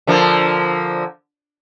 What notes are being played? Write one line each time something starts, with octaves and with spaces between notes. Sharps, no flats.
D3 F3 A#3